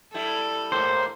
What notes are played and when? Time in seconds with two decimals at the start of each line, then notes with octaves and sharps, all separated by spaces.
0.14 G3 E4 A4
0.72 G#2 A#3 C5